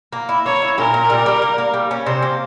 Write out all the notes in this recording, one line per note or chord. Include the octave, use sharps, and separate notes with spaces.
A#3
E4
A#3 C#5
E4
A#2 A#4
A#2
G3
G3
A#3
A#3
G3
C#4
C3 C5
A#3